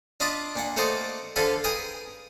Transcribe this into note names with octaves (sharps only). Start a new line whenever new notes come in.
D4 F4 D#5 A5 B5 D6
A#2 D4 F#5
A3 A#3 F#4 C5 D5 D#5
D3 F3 F4 A4 G#5 B5
G#4 A#4 B4 G5 G#5